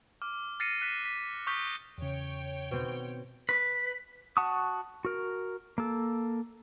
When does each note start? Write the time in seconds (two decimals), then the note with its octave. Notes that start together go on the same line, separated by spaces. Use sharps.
0.22 D6 F6
0.60 F6 A6 A#6 C7 C#7 D#7
0.82 F#6 A6 B6 E7
1.05 B6
1.47 C#6 D#6 F6 G6 B6 G7
1.98 E2 C#3 C#5 G5
2.71 B2 C4
3.49 B4
4.37 F#4 F#5 A5 C#6 D#6
5.05 F#4 A#4
5.78 A#3 A4